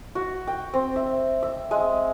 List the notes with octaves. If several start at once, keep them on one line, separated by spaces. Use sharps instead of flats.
F#4
G5
C4
E5
E5
G#3